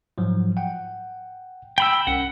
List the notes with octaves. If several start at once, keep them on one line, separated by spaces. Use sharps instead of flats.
G#2 F3 F#3
F#5 G5
G5 B5 E6
C2 C#4 F#5